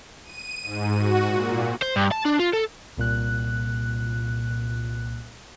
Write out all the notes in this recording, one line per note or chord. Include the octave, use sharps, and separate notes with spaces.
D#7
G#2
F#4
A#2
C5
G2
A5
D4
F4
A4
C2 A#2 F#6